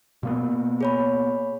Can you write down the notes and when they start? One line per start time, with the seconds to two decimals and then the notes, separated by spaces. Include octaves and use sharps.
0.23 B2 A#3 B3
0.81 G#4 C#5 B5